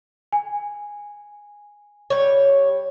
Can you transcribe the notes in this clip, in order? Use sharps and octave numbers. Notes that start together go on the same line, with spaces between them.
G#5
G3 C#5